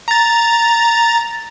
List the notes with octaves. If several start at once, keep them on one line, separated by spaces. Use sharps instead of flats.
A#5 A6